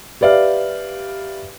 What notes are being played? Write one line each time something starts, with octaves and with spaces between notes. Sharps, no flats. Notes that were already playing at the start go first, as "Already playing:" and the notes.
G4 B4 D5 E5 F5